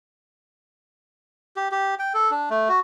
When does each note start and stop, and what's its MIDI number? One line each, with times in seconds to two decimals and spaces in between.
1.56 1.68 67
1.72 1.95 67
1.99 2.13 79
2.14 2.31 69
2.31 2.49 62
2.50 2.68 57
2.69 2.80 66